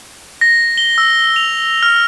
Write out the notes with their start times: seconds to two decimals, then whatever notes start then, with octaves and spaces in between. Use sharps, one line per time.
0.41 A#6
0.78 G7
0.98 E6
1.36 F7
1.83 F6